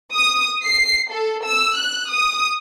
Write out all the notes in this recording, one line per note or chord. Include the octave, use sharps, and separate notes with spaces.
D#6
C7
A4
E6
F#6
D#6